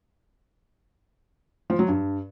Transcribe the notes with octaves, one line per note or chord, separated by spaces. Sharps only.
F3
F#3
G2